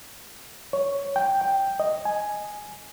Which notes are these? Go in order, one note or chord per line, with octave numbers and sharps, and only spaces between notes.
C#5
G5
G5
D#5
G#5